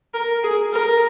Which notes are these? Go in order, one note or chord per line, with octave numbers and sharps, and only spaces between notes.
A#4
G#4
A#4